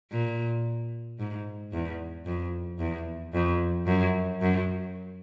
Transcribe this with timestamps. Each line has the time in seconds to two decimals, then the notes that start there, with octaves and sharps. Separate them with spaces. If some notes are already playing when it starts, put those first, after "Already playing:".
0.11 A#2
1.19 G#2
1.73 E2
2.26 F2
2.79 E2
3.34 F2
3.87 F#2
4.42 F#2